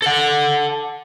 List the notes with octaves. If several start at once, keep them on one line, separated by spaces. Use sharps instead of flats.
A4 F#5